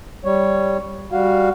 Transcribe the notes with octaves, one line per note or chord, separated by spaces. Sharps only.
G3 C#5
G3 F#4 F5